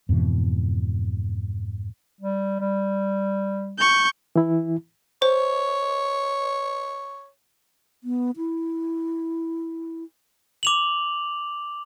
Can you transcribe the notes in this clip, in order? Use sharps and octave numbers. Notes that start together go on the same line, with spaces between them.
F2 G#2 B2 E3
G3
G3
C#6 G6
E3 E4
C5 C#5
B3
E4
D6 F7 F#7